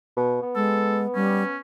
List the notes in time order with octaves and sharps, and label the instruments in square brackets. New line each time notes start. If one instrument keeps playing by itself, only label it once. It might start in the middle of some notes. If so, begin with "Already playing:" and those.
[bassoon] B2
B3
[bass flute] G#3 [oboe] A4
[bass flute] G3 [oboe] C#4